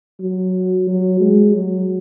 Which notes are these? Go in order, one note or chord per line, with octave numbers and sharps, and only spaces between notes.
F#3
F#3
G#3
F#3